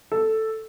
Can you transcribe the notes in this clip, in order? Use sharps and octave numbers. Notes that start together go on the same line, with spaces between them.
A4